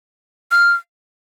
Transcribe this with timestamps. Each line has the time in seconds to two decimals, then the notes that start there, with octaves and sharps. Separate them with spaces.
0.51 F6